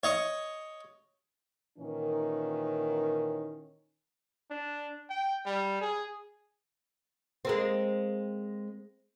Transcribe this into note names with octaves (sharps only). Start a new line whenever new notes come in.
C#5 D#5 C#6
A#2 D#3 E3 C#4 A#4
D4
G5
G3
G#4
G#3 A#3 C4